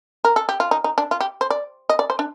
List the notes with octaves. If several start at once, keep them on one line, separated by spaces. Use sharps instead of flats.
A#4
A4
G4
F4
D#4
D#4
D4
F4
G4
C5
D5
D#5
D5
C5
D4